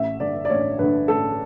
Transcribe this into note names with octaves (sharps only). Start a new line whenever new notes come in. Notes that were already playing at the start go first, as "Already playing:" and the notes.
Already playing: A1 E5
G2 D3 D5
D5
A1 C#5
G2 D3 B4
A1 A4